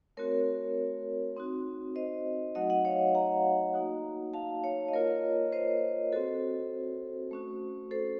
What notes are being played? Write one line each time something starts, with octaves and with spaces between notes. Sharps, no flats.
A3 C4 F#4 A#4 C#5
C4 D#4 F#4
C5 D#5
F#3 A3 D#4 F#4 D#5 F#5
D#5 F#5
C#5 F5
F#5 A#5
A#3 D#4 F#4
F5 A5
C#5 F5
D#5
A#3 F4 A#4 C#5
C5 D#5
C4 F#4 A4 C5
A3 C#4 F#4
A4 C5